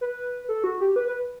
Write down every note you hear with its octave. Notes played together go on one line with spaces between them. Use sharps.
B4
A4
F#4
G4
B4
B4